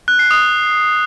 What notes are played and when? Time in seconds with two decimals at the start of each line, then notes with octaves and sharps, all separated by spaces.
0.08 F#6
0.19 C7
0.31 D#6